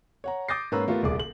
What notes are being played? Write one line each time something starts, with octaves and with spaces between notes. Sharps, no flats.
C#5 F#5 A#5
D6 D#6 G6 A6 A#6 C7
G#2 A#3 C#4 B4 A#5 E6
A3 B3 F4 G4 A#4
D#1 C2 G#4 D6
F#7